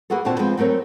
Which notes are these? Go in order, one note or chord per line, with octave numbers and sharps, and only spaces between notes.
A#3 B3 F#4 G#4 A4
D#2 A#2 D3 C4 F#4 A5
F3 G#3 B3 C4
F#3 A3 C4 A#4 C#5